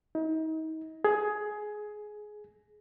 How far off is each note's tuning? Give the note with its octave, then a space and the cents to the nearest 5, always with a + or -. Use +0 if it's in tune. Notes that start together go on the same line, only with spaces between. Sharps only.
D#4 +35
G#4 +15